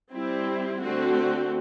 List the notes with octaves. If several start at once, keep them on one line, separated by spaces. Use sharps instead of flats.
G3 C4 E4
D3 A3 C4 F#4